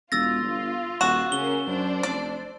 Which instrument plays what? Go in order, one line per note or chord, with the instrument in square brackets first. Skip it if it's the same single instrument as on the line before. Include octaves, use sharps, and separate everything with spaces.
[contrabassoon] E1 [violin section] F4 [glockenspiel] E6 A6 A#6
[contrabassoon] G1
[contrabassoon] D#1 [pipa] F#4 [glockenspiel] E7
[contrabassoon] C#3 [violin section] A#3 C#4 [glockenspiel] G7
[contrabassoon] F#2 [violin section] D4 C5
[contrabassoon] F1 [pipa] D5